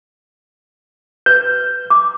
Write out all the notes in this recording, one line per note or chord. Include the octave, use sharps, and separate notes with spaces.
B4 G6
D6